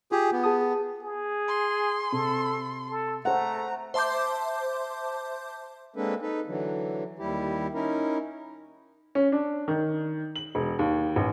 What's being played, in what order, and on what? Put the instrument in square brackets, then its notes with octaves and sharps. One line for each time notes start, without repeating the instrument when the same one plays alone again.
[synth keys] F4 [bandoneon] G4 G#4
[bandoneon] B3
[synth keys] G#4 A5 D#6
[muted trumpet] G#4
[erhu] C6
[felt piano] C3 [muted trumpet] A4
[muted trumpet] A4
[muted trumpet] A3 [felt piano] C5 F#5 [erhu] A#5
[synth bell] C5 E5 A5 C6 D6 G6
[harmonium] G#3 A#3 C4 D4 A4 B4
D#4 A4 B4
D3 E3 F#3
D#2 G3 E4 G4
C#4 D#4 E4 A#4
[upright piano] C#4
D4
D#3
F#7
E1
D#2
A1